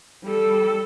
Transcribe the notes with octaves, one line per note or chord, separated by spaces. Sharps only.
G3 A4